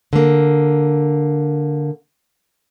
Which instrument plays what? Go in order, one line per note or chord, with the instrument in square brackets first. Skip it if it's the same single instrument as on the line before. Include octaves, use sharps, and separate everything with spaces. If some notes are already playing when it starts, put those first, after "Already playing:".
[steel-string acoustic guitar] D3 A#3